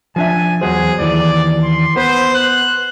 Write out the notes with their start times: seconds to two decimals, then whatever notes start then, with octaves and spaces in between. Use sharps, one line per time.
0.16 F3 D4 E5 G#5
0.62 E2 F#3 G#4 C5
0.99 D#2 E3 D5
1.63 C6
1.96 B3 B4 C5
2.35 F#6